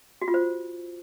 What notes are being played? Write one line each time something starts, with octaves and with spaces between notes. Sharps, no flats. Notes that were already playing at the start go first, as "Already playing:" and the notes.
F#4
F4
C5